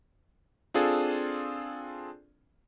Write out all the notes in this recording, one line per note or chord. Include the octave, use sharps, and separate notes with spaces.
C4 D4 F4 G#4 A4